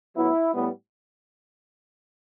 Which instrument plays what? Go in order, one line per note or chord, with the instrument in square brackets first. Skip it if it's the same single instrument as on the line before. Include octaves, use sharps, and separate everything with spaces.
[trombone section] A2 F#3 B3 E4
A2 G3 B3